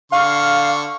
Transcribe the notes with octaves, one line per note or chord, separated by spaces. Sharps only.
D3 F5 C#6